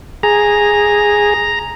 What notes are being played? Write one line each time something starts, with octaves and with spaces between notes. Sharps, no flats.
G#4 A#5